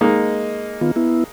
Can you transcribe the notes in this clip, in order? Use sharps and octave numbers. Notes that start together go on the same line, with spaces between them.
G#3 A#3 D#4
D#3 B3 F4
B3 E4